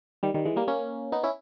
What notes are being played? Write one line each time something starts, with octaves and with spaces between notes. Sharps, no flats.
D#3 G3
D#3 G3
E3 G#3
G3 A#3
A#3 C#4
B3 D#4
C#4 E4